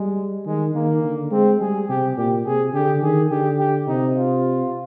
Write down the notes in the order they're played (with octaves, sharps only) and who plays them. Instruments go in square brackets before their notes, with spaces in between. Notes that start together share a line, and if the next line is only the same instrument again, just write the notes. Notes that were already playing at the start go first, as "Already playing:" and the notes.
Already playing: [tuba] G3 [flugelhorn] G#3
[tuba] D#3 [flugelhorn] G#3
[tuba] D#3 [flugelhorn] A#3
[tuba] D3
[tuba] G#3 [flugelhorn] C4
[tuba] G3 [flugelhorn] G#4
[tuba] C3 [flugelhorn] G4
[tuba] A#2 [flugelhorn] G4
[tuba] C3 [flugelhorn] G#4
[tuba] D3 [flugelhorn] G4
[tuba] D#3 [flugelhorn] G#4
[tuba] D3 [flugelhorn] G4
[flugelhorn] G4
[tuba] C3 [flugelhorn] D#4
[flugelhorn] F4